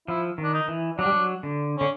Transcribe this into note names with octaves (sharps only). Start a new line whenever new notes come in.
F3 E4
D#3
D4
D#4
E3
F#3 D4
G3
F#3
D3
D3 C#4